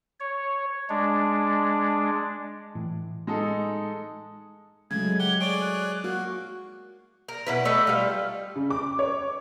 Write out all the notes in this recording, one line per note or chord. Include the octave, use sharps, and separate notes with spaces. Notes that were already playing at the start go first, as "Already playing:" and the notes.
C#5
G#3 D4
A2 E3
G#3 D#4 A4
C#3 F#3 G#3 A3 G#6
G4 F#5 G7
G#4 C#5 D5 D7
F#6
A#3 F#4
A#4
B2 E4 B4
A3 A4 B4 D#5
G3 F4
C#3
D6
C#5